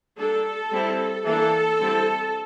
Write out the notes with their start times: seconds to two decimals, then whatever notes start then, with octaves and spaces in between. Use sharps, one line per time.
0.19 G3 A#3 D4 A4
0.73 G3 C4 E4
1.25 E3 A#3 D4 A4
1.79 D3 G3 C4 E4